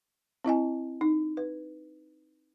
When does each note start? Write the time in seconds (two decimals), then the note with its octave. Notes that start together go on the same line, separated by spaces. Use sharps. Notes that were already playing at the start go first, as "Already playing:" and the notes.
0.45 C4 E4 D#5 G#5
1.01 D#4
1.37 B4